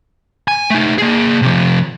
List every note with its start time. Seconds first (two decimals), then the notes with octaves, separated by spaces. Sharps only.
0.48 G#5
0.70 A3 D#4
0.98 A#3 G#4
1.42 C3 F3